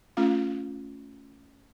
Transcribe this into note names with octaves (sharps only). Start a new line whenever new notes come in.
A3 C#4 F4 F5